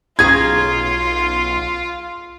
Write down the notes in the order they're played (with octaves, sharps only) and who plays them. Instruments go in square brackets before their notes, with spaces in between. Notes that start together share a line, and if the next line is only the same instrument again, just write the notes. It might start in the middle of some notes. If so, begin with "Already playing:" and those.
[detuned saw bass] B1 [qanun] C#4 G#4 A#5 [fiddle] F4 [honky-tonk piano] G#6